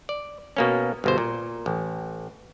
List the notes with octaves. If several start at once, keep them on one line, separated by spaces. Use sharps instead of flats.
D5
B2 A#3 C#4
G1 B2 C5
A#2
A1